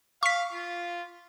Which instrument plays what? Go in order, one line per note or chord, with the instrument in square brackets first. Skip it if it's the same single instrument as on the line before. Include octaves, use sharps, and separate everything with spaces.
[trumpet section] F5 [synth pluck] C#6 B6
[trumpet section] F4